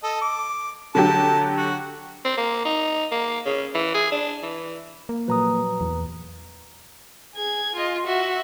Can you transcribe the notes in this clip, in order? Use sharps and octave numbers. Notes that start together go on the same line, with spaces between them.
A4 D#5
D6
D3 F#3 G4 A5
F#4
C4
A#3
D#4
A#3
C#3
E3
G#4
D4
E3
A#3
A#2 F3 F#3 B4 A#5 D#6
E2
G#4 G#6
F4 D#5
F#4 E5